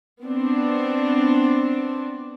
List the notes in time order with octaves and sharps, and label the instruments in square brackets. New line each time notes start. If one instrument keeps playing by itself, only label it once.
[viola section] B3 C4 D4